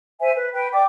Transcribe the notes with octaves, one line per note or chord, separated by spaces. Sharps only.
C5 E5 G#5
B4
B4 G5
D5 G5 D6